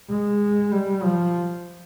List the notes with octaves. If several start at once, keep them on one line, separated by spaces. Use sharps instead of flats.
G#3
G3
F3